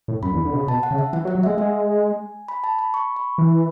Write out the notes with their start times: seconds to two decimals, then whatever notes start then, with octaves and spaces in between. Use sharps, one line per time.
0.08 A2
0.23 F#2 B5
0.34 E2
0.45 D3
0.52 B2
0.56 C#3
0.67 B2 A5
0.83 F#5
0.91 C#3
0.98 E5
1.13 E3 F#5
1.25 F#3
1.28 F#5
1.35 F#3
1.43 G#3 E5
1.58 G#3 G#5
2.48 B5
2.64 A5
2.79 B5
2.94 C#6
3.16 B5
3.38 E3